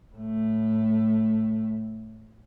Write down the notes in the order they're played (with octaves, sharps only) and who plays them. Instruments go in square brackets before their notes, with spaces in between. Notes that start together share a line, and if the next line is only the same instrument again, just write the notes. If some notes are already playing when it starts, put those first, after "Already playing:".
[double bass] A2 A3